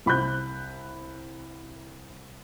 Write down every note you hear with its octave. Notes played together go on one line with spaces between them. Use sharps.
C2 B5 F#6 G6